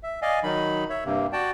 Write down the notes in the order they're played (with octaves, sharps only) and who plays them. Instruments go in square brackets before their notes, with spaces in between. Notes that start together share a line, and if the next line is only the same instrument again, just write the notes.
[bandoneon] E5
D5 D#5 F5 G#5
D#3 F#3 D#4 B5
C#5 E5
G2 C3 A#3
F#4 D5 G5 A5